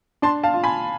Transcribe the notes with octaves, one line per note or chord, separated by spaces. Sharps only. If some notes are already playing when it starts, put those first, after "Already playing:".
D4 A5 C6
F5 A5
F4
G#5 B5